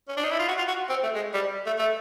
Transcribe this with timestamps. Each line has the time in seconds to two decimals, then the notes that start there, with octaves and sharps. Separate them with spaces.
0.08 C#4
0.17 D4
0.24 D#4
0.31 E4
0.39 F4
0.48 F#4
0.58 F4
0.68 F#4
0.90 C4
1.03 A3
1.15 G#3
1.34 G3
1.66 A3
1.78 A3